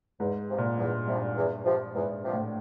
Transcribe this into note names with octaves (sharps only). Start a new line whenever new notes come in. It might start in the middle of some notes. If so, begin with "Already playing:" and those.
E2 G#2
C3 F3
A#2
E2 G2
G2 C3 F3
E2
C3 F3
E2 G#2
C3 F3
A2